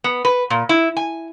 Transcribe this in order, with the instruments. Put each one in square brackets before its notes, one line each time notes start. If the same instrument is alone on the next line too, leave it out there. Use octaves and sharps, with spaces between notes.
[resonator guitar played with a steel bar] B3
B4
A#2
E4
G#5